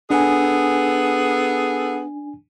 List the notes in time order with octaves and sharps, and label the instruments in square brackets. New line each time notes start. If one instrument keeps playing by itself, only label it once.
[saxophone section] B3 G#4 A4 [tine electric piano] D4 G#5